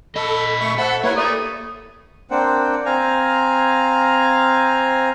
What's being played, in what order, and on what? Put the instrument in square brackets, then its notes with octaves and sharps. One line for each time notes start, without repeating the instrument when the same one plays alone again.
[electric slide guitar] A#2 D#5 [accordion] A4 [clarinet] B5
[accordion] A3 E5 C#6
[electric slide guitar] A4 [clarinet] C5 [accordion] E5 F#5 B5
[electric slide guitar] A#3 [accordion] E4 B4 [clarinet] G4 [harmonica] C#5
[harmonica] A3 D#6 [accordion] D5
[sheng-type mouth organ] A#3 C4 D4 C5 F#5 G5
C4 F5 G#5 A#5